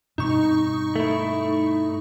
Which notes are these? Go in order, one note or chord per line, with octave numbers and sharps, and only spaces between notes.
G2 B2 C4 D#4 C#6
A3 E4